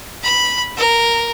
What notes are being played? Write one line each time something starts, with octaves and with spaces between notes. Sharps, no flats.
B5
A#4